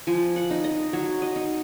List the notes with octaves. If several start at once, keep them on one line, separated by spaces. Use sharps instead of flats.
F3 G#5
F#5
D#4
D#5
F#3 C#5
D#5
D#4